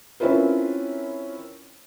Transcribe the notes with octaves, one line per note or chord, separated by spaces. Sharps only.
C4 C#4 E4 F4 A#4 B4